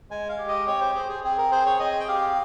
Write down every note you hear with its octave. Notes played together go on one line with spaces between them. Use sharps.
G#3 G#5
F5
G4
D#5
C4 C#5
C5
G#4 C5
G#4
C4 G#4
A#4
G#4 C5
C#5
C4 D#5
G5
G4 F5